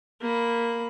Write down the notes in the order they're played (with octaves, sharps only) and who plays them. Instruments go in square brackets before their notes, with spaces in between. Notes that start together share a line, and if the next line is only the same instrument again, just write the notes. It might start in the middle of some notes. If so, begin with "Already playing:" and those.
[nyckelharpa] A#3 B5